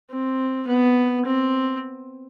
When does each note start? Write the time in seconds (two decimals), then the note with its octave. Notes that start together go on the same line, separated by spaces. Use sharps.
0.10 C4
0.67 B3
1.25 C4